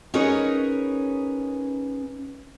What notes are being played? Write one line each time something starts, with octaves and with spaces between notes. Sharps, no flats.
C#4 D#4 G#4 A#4 B4 C#5